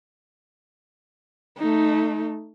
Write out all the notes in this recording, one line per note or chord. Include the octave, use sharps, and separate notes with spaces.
A3 D#4